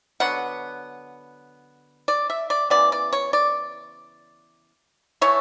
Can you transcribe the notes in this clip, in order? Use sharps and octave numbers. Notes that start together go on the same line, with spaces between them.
D3 F#3 B3 F#5
D5
E5
D5
C#3 E3 B3 D5
D5
C#5
D5
E3 A3 C#5